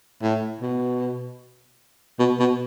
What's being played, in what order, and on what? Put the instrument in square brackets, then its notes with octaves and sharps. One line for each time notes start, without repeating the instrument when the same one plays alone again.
[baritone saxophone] A2
B2
B2
B2